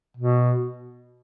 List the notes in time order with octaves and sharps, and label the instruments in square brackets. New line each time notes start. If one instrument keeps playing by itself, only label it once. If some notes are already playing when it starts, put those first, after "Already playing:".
[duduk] B2